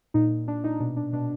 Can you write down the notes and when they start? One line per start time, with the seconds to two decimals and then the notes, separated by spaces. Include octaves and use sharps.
0.14 A#2 D#4
0.31 A#2
0.47 A#2 D4
0.64 A#2 D#4
0.80 B2 D4
0.96 B2 D4
1.13 B2 D4